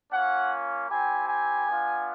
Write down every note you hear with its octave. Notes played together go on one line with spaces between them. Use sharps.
A#3 C#4 F4 F#5
C4 E4 G4 G#5
G#5
B3 D4 F4